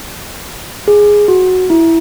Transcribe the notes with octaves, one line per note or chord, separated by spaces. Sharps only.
G#4
F#4
E4